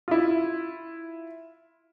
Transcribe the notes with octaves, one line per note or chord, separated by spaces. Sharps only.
E4 F4